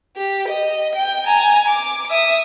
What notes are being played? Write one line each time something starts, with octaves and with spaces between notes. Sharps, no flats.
G4
D#5
G5
G#5 A#5
D6
E5 D#6